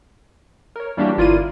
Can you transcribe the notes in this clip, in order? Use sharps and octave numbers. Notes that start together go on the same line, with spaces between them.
A#4 C#5
E3 G3 A#3 D4 F#4 G4
G1 E4 F4 A#4 D5 D#7